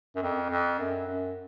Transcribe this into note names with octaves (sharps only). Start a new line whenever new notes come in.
F#2
F2
F2
F#2
F#2